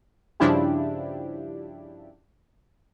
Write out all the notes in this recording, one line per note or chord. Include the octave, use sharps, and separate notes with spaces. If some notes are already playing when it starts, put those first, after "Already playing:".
G2 C#3 F3 D4 E4 G4